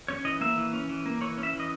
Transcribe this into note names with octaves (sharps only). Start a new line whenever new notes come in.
C#4 C#5
E3 D#5
A#3 E5
E3
C#4
E3
A#3
E3 C#5
C#4
E5
E3
D#5